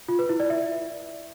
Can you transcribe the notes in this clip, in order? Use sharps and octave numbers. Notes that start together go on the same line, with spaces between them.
F4
B4
E4
D5
E5